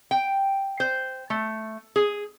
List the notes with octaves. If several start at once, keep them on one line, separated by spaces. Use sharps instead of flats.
G5
C5
A3
G#4